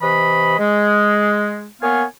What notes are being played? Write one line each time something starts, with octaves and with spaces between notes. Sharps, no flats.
C3 E3 D#5 B5
G#3
A#3 B3 C#5 F5 G#5